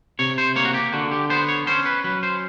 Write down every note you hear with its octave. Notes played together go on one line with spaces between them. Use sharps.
C3 C#5
C5
A#3 C#5
F#4
G4
D3 F#4
G4
B3 C5
C#5
C#4 C5
B4
F#3 B4
C5